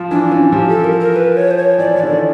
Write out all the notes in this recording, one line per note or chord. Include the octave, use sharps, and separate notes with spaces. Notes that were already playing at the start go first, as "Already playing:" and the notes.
Already playing: F3
E3 D4
E3 C#4
F3 G4
A4
A#4
A#4
B4
C#5
C5
C#5
E3 D5
E3 C#5
D3 D5
D#3